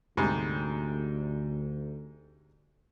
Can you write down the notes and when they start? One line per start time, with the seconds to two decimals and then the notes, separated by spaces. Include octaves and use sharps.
0.17 D2 G#2 C3 G3